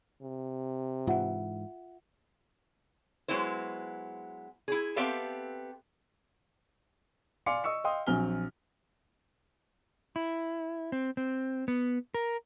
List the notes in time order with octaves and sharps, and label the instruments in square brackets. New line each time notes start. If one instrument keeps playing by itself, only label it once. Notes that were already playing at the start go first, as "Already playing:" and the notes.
[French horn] C3
[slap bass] G#2 E3 [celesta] F4 E5 F#5
[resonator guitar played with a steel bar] F#3 G#3 B3 E4 C5
E4 G#4
B3 C4 G4 A4 E5 F5
[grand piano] D5 F5 G#5 C6 D6 C#7
D#5 C#6 D#6 E6 C#7
D#5 F5 G5 C6 D#6
A#1 F#3 C4 G#5 F6 G7
[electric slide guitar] E4
C4
C4
B3
A#4